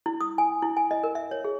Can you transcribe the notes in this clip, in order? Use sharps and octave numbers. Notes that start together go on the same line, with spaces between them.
E4
D#6
G#5
E4
G#5
D#5
A#4
E5
C#5
G#4